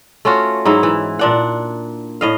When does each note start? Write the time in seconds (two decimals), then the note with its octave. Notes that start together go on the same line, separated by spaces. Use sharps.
0.25 A3 C#4 F4 F#4
0.65 G#2 F#3 D#4 E4
0.83 E3
1.19 A#2 D4 F#5
2.21 A2 D#5 F5